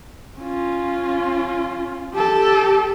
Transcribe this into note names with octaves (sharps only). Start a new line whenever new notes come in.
C#4 F4
G4 A4